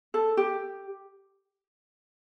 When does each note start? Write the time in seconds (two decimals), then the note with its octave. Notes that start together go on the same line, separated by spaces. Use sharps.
0.14 A4
0.37 G4